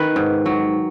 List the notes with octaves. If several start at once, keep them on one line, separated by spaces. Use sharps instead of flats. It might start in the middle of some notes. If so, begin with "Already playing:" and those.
Already playing: D#3 B4
G#2
F#3